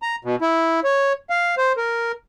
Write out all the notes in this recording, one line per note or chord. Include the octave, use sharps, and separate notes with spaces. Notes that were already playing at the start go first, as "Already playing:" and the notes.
A#5
B2
E4
C#5
F5
C5
A#4